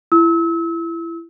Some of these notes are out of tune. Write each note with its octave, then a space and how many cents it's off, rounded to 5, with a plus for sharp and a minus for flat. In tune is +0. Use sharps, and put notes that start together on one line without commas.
E4 +25 E6 -35